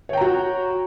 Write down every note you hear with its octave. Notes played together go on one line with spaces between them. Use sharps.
F#4 C#5 G5 A#5